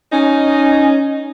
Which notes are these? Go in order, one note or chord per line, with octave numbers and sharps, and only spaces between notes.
C#4 D#4